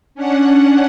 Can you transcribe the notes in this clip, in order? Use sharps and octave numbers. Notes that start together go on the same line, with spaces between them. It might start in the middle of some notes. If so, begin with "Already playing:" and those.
C#4 D4 F#5